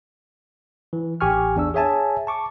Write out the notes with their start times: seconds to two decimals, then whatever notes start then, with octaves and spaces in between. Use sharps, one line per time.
0.93 E3
1.21 A1 G4 G#5 C#6 F6
1.56 E2 D4 E6
1.74 G#4 C#5 E5 G#5 A5
2.27 A5 C#6 D6